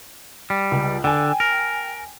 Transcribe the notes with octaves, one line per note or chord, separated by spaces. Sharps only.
G3
C#2
D3 G5 G#5
A#4